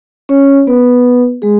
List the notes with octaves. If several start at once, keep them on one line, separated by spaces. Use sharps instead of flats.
C#4 C#5
B3 B4
G#3 G#4